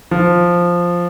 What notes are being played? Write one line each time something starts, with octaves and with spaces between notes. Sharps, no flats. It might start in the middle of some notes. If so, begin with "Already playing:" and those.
F3